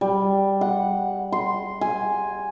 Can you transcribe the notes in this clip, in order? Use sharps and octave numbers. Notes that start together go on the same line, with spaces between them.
G3
F#5
C6
G#5